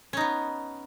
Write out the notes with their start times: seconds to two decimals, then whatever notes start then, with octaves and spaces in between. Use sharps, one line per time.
0.13 C#4
0.17 D#4
0.21 B3